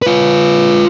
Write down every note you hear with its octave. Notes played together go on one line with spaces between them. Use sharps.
F4 B4